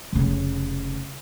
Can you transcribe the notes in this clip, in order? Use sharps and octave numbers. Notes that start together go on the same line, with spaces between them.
F1 C#3